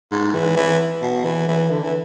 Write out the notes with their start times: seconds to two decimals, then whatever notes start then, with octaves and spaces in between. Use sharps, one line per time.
0.12 G#2
0.35 E3
0.57 E3
1.02 B2
1.25 E3
1.48 E3
1.70 D3
1.83 E3